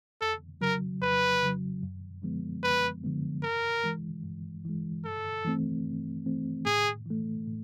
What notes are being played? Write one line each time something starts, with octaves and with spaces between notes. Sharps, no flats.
F2 A4
C#3 F#3 A#4
F2 B4
C#3 F#3
F#2
D3 F3 G#3 B3
F#2 B4
D3 F3 G#3 B3
G2 A#4
E3 G#3
G2
E3 G#3
G2 A4
E3 A3 C4
G2
E3 A3 C4
A2 G#4
E3 A3
A2